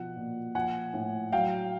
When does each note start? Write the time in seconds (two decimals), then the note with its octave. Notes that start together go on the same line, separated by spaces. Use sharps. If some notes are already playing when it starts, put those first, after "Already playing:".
Already playing: B2 F3 F#5
0.16 A#2
0.55 F3 F#5 G#5
0.94 A2
1.32 F#3 F5 G5